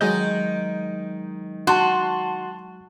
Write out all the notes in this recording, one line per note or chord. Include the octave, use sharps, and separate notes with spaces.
D#3 F#3 G#3 D#4 D#5 G6
F#4 A5 C6